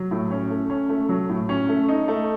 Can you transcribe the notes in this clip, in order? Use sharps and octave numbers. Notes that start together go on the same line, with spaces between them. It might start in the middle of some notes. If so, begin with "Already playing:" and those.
Already playing: F#3
A2
C#4
A3
C#4
A3
F#3
A2
C#4
A3
D#4
A3